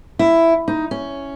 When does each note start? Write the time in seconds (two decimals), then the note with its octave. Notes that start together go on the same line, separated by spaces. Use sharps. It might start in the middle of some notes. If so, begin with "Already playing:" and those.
0.19 E4
0.68 D#4
0.91 C#4